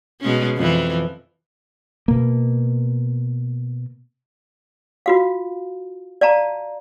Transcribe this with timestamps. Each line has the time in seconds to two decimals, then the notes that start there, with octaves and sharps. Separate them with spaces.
0.21 B2 G#3 C#4
0.57 F2 E3
2.08 B2 A#3
5.06 F4 F#4 F5
6.21 D5 F5 A5 A#5